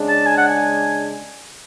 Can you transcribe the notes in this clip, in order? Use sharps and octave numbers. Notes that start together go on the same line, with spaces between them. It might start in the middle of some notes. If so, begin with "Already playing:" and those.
Already playing: C#3 G#3 D4
A5
G#5
F#5
G#5